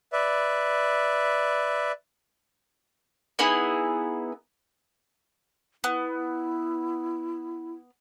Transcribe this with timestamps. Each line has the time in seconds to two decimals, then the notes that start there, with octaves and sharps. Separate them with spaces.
0.13 B4 D5 E5
3.39 B3 D#4 E4 G#4
5.84 B3 E4